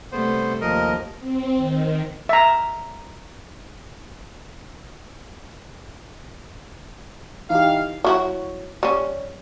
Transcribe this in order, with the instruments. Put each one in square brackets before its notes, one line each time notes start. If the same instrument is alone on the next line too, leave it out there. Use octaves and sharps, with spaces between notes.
[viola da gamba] C3 G3 A3 [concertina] B3 C5
[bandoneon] D#2 F3 [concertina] A#4 D#5
[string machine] C4
D#3
[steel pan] E5 A#5
[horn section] E3 F5 [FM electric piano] D#4 G4
[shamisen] F#3 E4 F#4
G3 C#4